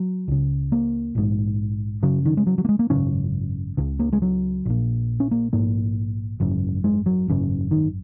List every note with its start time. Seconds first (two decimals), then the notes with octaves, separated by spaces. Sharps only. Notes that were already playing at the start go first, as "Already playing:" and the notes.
Already playing: F#3
0.28 C#2 C#3
0.72 A#3
1.15 A#1 G#2
2.03 F#1 F#2 C#3 F#3
2.25 D#3
2.37 G#3
2.47 F#3
2.58 F#3
2.65 A#3
2.69 G#3
2.79 A#3
2.90 G#1 F#2 C#3 C#4
3.77 C#2 C#3
3.99 A#3
4.13 G#3
4.22 F#3
4.66 A#1 A#2
5.20 C#4
5.31 A#3
5.53 A#1 G#2 A#3
6.40 G#1 F#2 C#3
6.84 G#3
7.06 F#3
7.28 G#1 F#2 C#3
7.71 D#3